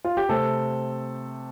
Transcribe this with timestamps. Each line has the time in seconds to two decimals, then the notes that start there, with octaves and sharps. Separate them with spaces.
0.05 F4
0.17 G4
0.29 C3 A3 C4 A4